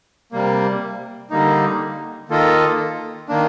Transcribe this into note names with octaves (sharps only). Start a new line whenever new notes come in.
C3 G3 A#3
D3 G3 A#3 D#4
D#3 A#3 F4 A4 D#5
D#3 A#3 D4